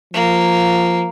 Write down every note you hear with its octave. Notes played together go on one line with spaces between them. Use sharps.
F3 A#3